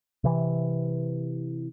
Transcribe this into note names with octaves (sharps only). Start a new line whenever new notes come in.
C3 E3